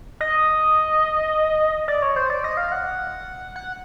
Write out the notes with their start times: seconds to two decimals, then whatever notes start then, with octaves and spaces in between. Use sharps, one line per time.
0.21 D#5
1.88 D5
2.02 C#5
2.16 C5
2.30 D5
2.44 D#5
2.57 F5
2.72 F#5
3.56 F#5